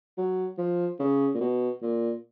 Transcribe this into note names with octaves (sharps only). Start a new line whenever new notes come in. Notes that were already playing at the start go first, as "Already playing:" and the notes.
F#3
F3
C#3
A#2
B2
A#2